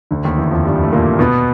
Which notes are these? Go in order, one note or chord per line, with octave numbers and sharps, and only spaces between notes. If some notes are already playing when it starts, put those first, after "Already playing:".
D2 D3
D#2 D#3
E2 E3
F2 F3
G2 G3
A3
A#2 A#3
B2 B3